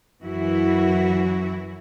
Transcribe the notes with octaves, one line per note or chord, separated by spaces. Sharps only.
F#2 E3 E4 F#4